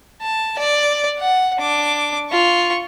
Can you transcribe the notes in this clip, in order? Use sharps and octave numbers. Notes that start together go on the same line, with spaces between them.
A5
D5
F#5
D4 D6
F4 C#6